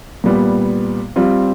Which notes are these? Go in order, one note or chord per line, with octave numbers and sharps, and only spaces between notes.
A#2 G3 B3
G3 C4 F4